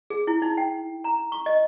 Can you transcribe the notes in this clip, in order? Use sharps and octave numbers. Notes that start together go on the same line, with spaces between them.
G#4
E4
D#4
G5
A#5
C#6
D#5